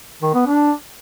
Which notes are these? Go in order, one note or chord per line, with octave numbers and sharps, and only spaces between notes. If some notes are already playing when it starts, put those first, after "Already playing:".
D#3
B3
D4